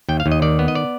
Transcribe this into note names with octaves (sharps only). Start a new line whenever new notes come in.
D#2 G5
F5
D#2
D#5
D#3 D5
B3
D#5
D5